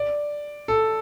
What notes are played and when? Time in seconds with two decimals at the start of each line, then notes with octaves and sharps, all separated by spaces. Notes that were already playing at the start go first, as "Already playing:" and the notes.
Already playing: D5
0.68 A4